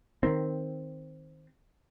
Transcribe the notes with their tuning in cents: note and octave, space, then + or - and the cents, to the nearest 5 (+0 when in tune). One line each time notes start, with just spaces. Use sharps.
D#3 +0 C4 +0